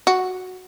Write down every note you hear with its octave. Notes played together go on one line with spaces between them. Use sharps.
F#4